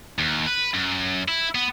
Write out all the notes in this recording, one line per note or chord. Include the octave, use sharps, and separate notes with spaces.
D#2
B4
F#2
E4
B3